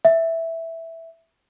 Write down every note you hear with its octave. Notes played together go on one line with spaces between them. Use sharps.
E5